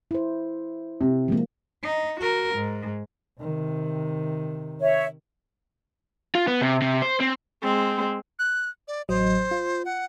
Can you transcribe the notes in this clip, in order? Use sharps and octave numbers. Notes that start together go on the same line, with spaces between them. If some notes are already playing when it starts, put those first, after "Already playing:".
E4 C5
C3
F3 G#3 A#3
D#4
F#4 A#4
G#2
C3 D#3
C#5 E5
F4
B3
C3
C3
C5
C4
G#3 C4
F#6
D5
A1 F#3 C5 D#5
F4
F#5